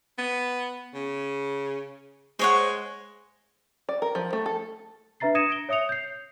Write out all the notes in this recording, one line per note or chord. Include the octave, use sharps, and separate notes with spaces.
B3
C#3
G#3 C5 C#5 F#5
D5
A#4
F3
A3
A4
D4 B4 E5 A#5 A6 C7
D#6 G#6 A#6 C#7 D#7 E7
A#6 D7 G7
C#5 E5 D#6 C#7 F7
G6 C7